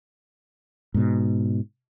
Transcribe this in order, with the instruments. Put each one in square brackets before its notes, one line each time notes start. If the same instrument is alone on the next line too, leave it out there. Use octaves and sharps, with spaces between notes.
[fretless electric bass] G#2 B2